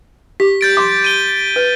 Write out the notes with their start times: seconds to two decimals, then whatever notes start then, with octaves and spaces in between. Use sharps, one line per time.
0.40 G4 B6
0.61 G6 A6 D7
0.77 C6 D6
1.04 D#7 G7
1.56 B4